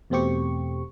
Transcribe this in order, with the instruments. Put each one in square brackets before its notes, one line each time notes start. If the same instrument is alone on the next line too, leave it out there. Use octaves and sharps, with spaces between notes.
[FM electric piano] E2 B2 A3 C4 G4 C#6